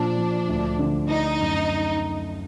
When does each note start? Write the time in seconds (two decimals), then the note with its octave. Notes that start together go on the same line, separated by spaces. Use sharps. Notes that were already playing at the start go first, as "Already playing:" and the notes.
Already playing: A#2 F3 D4
0.18 F3
0.49 D2
0.79 D3
1.09 D4 D#4
1.41 F#2